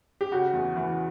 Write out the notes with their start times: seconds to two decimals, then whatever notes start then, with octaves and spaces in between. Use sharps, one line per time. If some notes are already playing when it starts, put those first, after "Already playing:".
0.21 G4
0.32 C#3 F#4
0.53 E2
0.76 E3